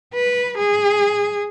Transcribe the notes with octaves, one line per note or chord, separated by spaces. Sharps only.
B4
G#4